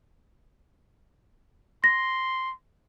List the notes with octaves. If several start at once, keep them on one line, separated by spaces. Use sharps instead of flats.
C6 A#6